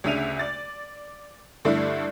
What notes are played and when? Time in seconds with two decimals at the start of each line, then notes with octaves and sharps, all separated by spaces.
0.04 D2 C#3 D4 E5 D#7 F7
0.39 D5 A6
1.65 G2 D3 A3 D4 E4